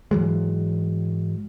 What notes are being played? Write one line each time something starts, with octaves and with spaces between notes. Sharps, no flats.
G#2 E3 F#3 G#3